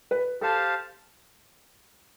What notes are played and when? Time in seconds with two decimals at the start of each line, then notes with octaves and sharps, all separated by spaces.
0.11 B4
0.41 G4 A4 C5 F5 A5